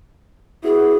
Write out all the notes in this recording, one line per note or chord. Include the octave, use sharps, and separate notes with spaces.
B3 E4 F#4 G#4